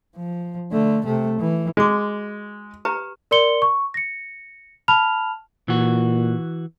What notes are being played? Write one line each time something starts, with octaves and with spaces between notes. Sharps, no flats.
F3
D3 A3
C3 A3
E3
G#3 F#4 D6
G4 B4 A#5
A#4 D5 C6 C#7 G7
C#6
A#6 C#7
A5 B5 F6 F7
A#2 E3 F#4